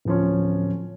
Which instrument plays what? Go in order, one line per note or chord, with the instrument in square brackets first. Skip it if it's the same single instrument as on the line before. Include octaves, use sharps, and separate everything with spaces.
[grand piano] D1 F3 C#4